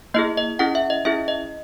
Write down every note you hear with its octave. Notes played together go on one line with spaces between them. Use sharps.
A#3 E4 G#4 D#5
D#5
C#4 E4 G#4 F#5
E5
D#5
C#4 E4 G#4 E5
D#5